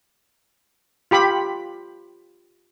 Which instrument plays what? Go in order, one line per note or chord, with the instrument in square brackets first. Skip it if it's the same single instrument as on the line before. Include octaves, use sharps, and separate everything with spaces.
[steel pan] F4 G4 B5